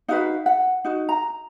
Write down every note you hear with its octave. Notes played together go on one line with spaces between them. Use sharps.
D#4 F#4 B4 F5
F#5
D#4 F#4
A#5